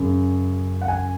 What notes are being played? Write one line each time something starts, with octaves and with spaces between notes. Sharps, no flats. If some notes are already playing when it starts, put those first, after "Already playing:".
Already playing: F#2 C#3
F#5
G#5